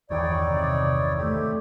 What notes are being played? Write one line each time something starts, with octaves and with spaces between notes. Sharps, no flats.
G1 E2 D#3 D#4 E4 C#5 D5
C3
A3 C4 G4